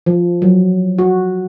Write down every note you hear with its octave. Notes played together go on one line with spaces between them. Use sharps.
F3
F#3
F#4